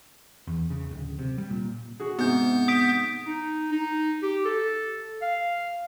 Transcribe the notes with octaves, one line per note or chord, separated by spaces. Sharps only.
E2
C#3
D1
C3
G3
A#2
F#4 G#4
G#2 C3 B3 G6
D#6 B6 D7
D#4
D#4
G4
A4
F5